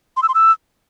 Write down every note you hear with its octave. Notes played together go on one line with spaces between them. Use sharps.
C6
E6
C6
E6